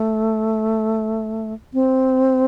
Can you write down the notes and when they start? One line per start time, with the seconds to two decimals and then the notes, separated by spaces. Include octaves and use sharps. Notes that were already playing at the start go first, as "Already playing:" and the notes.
Already playing: A3
1.74 C4